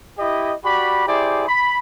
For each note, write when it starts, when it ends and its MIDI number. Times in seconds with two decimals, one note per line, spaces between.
0.18 0.53 64
0.18 0.53 67
0.18 0.53 75
0.63 1.03 66
0.63 1.03 67
0.63 1.03 74
0.63 1.03 83
1.06 1.44 64
1.06 1.44 67
1.06 1.44 68
1.06 1.44 72
1.06 1.44 74
1.48 1.77 83